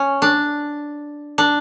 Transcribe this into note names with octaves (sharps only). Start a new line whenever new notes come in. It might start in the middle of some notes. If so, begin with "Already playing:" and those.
Already playing: C#4
D4
D4